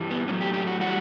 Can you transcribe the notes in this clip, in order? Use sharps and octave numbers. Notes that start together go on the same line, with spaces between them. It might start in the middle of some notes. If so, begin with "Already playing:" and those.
Already playing: G2 E3 G3
B3
A2 F#3 A3 C#4
G4
G4
F#4
E3 G3 F#4